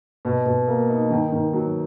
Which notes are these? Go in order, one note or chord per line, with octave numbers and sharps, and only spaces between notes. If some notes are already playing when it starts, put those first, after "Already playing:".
B2
B2
A#3
D#4
D#3
D#3
F#3